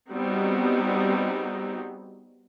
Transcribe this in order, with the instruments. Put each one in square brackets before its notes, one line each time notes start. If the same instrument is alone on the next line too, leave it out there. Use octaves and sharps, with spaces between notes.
[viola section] G3 B3 C4 D#4 F#4 G#4